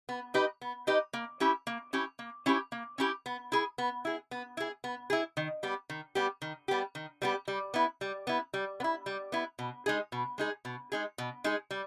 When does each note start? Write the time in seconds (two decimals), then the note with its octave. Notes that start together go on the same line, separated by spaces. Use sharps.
0.09 B3
0.34 D#4 G4 B4 D#5
0.61 B3
0.87 D#4 G4 B4 D#5
1.13 A#3
1.40 C#4 E4 G4
1.67 A#3
1.93 C#4 E4 G4
2.19 A#3
2.46 C#4 E4 G4
2.72 A#3
2.98 C#4 E4 G4
3.26 B3
3.52 E4 G#4
3.78 B3
4.05 E4 G#4
4.31 B3
4.57 E4 G#4
4.84 B3
5.10 E4 G#4
5.37 D#3
5.63 G3 B3 G4
5.90 D#3
6.15 G3 B3 G4
6.42 D#3
6.68 G3 B3 G4
6.95 D#3
7.22 G3 B3 G4
7.48 G3
7.74 B3 E4
8.01 G3
8.27 B3 E4
8.54 G3
8.80 B3
8.84 E4
9.06 G3
9.32 B3 E4
9.59 B2
9.86 G#3 D#4 G#4
10.12 B2
10.38 G#3 D#4 G#4
10.65 B2
10.92 G#3 D#4 G#4
11.18 B2
11.44 G#3 D#4 G#4
11.71 G3